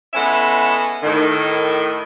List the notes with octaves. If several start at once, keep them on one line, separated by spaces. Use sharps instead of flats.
G#3 B3 C#4 E4 A4 E5
A2 D#3